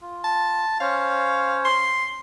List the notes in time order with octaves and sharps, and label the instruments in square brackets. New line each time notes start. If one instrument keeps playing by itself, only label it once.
[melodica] F4
[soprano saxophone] A5
[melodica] C#4 C5 C#5 [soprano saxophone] F5
[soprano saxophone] C6